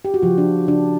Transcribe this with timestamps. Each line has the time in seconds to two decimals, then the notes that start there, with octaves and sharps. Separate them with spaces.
0.05 G4
0.14 F#4
0.22 C#3 F3 F4
0.38 D4
0.46 C#3
0.67 C#3 D4